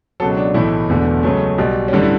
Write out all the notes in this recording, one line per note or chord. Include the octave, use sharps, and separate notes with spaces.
C#2 B2 F#3 A4
D4
B1 A2 E3 A3 E4
E1 E2 D3 A3
C#2 C#3 F#3 A3
B1 B2 G3
C#4
A1 G2 D3 G3 D4
E4